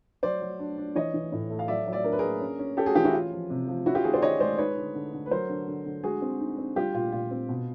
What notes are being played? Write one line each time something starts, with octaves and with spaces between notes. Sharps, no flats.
F#3 C5 D5
F#3
D4
D4
E3 C#5 D#5
E3
A2
A3
F5
F#3 D5 E5
F#3
D5 E5
D4 A#4
B4
A#3 G#4 A#4
C#4
C#4
C#4 G4 A4
F#4 G#4
E3 F4 G4
E4 F#4
C#4 F4
F3
C3
F3
C#4 E4 F#4
F4 G4
D#3 F#4 G#4
C5 D5
D#3 C#5 D#5
G#3 C5 D5
D#4 B4 C#5
D3
D3
D3
B4
F#3 A#4 C5
D3
D3
D3
G#3 F#4 G#4
C4
D#4
C4
G3 F4 G4
A#2 F4
A#2 F4
C4
B2